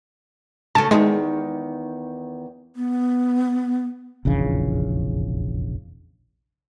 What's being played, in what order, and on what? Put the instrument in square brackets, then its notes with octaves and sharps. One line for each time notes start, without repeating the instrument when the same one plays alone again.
[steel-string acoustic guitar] C#3 A3 [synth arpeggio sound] A5
[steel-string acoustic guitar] E2 D#3 [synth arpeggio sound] G#3
[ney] B3
[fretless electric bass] F1 A#1 E2 C#3